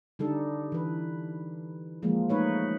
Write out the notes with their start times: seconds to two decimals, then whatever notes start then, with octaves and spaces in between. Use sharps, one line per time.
0.19 D3 G3 D#4 A4
0.72 E3 B4
2.03 F3 G#3 A#3
2.29 A3 D#4 B4 C#5